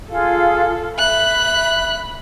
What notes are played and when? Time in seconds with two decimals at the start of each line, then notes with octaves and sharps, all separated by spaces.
0.11 F4 G#4 A4 F5
0.99 E5 B5 F#6